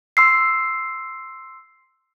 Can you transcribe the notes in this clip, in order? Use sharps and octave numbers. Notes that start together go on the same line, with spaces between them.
C6 E6 C7